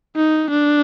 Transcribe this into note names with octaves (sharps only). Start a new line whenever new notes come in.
D#4
D4